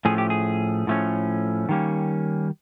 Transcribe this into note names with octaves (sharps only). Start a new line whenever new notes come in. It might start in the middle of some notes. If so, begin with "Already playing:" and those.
A2 F3 A3 C#4 G#4
G4
G#4
A2 F3 A3 C#4
D#3 G3 A#3 C#4